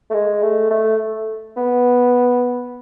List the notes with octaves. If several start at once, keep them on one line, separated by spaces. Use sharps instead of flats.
A3
G#3
A3
A3
B3